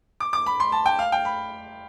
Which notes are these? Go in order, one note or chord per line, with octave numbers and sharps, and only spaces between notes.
D6
D6
B5
C6
A5
G5
F5
G5
B5